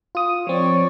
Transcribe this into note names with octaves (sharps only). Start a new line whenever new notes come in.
F4 D#6
F3 C4 C#5 D5